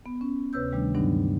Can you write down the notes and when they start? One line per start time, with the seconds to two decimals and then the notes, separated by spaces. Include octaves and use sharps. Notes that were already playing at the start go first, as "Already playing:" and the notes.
0.06 B3
0.21 C#4
0.53 D2 C3 B4 C#5 E6 G6
0.71 C3 D#3 G3 A3 D4
0.95 G2 D3 F#3 B3 D4 D#4